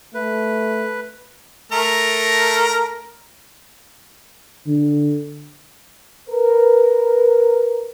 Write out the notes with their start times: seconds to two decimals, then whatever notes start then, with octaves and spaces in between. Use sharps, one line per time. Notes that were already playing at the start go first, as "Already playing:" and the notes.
0.14 A3 B4
1.72 A3 A#4 A#5
4.67 D3
6.29 A#4 B4